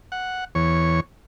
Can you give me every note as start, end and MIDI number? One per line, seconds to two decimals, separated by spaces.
0.12 0.44 78
0.55 1.00 40
0.55 1.00 73